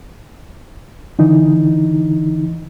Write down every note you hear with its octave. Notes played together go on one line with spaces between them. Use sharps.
D3 E3 D#4